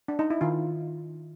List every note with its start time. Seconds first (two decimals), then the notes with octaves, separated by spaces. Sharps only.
0.08 D4
0.19 D#4
0.30 E4
0.41 D#3 F4